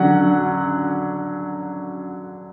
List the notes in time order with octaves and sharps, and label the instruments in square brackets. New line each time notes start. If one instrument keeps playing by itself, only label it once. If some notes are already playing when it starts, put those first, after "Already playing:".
Already playing: [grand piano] D3 F#3 C#4 F#5